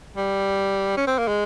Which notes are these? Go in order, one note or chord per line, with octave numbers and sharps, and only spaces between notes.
G3
C#4
C4
A#3
G#3